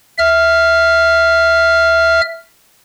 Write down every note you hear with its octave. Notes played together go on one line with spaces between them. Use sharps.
E5 F6